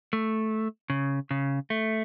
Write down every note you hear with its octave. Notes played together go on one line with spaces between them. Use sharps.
A3
C#3
C#3
A3